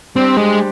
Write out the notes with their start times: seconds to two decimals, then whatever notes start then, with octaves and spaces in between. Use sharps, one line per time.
0.16 G3 C4 D4 G4 C5
0.37 G#3